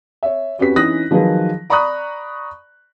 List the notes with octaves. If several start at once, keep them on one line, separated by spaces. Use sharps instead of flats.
C#5 E5
F2 C#4 F#4 G4 B4 B6
E3 C#4 D#4 D#6 F#6 A#6
D#3 F3 F#3 G#4 B4
D5 A#5 B5 C#6 D#6 F#6